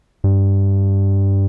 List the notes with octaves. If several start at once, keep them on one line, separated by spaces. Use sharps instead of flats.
G2